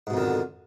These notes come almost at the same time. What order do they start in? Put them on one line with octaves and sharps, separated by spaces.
G#2 B2 F2 D#3 D3